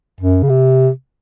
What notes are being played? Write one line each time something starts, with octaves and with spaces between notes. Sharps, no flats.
F#2
C#3
C3